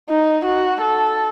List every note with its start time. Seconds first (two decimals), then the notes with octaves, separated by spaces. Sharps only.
0.10 D#4
0.45 F#4
0.81 A4